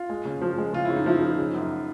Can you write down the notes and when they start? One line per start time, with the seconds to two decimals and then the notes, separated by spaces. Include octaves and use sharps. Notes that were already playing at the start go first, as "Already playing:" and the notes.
Already playing: F4
0.09 G#3
0.25 C#3
0.42 F3
0.58 G#3
0.73 C#3 F4
0.85 C#3 E4
0.96 D#4
1.06 F3 E4
1.22 F3
1.38 C#3
1.55 F#2